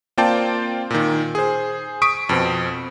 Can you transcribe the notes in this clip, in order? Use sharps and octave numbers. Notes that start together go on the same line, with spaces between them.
A#3 C4 F4 D5 G5 A5
A#2 D#3
G#4 C5
C#6 D#6 B6 D7
F2 B2 C4